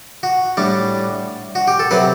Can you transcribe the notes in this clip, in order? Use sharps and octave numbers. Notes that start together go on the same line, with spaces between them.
F#4
A2 G3 D4
F#4
G4
A4
C3 F#3 C4 B4